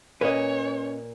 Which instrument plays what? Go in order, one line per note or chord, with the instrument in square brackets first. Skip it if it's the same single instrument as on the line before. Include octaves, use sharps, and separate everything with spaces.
[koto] A#2 [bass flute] C#4 [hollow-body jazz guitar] B4 D#5 [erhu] C#5